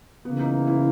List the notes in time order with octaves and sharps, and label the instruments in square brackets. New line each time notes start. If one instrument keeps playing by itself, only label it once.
[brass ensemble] C#3 E3 A#3 [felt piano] B3
[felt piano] D#4
E4